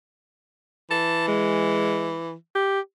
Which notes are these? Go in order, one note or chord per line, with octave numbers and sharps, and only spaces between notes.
E3 A5
G#3
G4